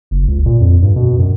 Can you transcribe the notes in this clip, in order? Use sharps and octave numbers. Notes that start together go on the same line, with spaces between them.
F#1
C#2
A#2
F2
G2
B2
F#2